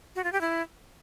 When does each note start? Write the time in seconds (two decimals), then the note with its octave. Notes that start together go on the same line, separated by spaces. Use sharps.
0.16 F#4
0.24 F4
0.33 G4
0.41 E4